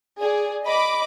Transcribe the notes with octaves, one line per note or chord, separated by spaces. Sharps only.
G#4 D5
D#5 B5 D6